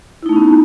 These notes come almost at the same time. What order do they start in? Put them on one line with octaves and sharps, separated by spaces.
E4 D#4 A3 C#4 B3